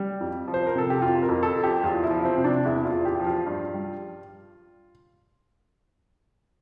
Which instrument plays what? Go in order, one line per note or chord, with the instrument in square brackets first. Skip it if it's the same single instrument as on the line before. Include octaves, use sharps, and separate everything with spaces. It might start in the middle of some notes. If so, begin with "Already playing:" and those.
Already playing: [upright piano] G3
F2
F3
C5
A#4
C3 A4
G4
F2 F4
A#4
F2
A4
F3
G4
E2 F4
E4
F3
C4
C3
D4
E2 E4
F4
E2
G4
F3
F4
G2
G3